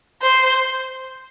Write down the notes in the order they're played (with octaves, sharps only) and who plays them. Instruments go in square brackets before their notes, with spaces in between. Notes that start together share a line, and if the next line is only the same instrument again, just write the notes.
[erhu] C5